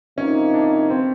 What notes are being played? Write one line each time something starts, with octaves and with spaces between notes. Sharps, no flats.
C3 F3 A#3 C#4 D#4
D4
C4